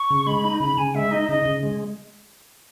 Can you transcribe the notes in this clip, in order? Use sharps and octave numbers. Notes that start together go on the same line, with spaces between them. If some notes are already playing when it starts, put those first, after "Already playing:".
Already playing: C#6
C#3
G#3 B5
D#4
C#3 B5
C#3 G#5
G#3 E5
D#4 D#5
C#3 D#5
C#3
G#3